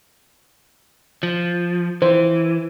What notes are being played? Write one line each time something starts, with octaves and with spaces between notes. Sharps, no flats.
F3
E3 C5